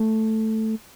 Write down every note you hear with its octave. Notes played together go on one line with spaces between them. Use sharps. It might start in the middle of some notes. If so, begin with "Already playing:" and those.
Already playing: A3